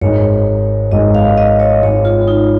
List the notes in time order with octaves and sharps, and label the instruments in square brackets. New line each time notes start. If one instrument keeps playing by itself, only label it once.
[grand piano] G#1 G#2 G#3 D#4 [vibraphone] C#5
[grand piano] G#1 G#2 G#3 D#4 [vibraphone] D#5
[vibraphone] F5
D#5
C#5
[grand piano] G#1 G#2 G#3 D#4 [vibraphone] C#5
[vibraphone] F4
D#4